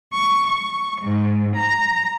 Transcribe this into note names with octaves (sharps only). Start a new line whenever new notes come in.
C#6
C#6
G#2
A#5